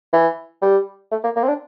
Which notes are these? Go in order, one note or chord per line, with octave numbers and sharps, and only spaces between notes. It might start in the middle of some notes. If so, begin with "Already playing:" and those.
E3
G3
A3
A#3
A#3
C4
D4